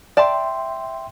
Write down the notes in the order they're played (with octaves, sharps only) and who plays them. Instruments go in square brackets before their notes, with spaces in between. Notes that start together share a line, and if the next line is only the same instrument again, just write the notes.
[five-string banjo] D5 A5 [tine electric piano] E5 G5 C6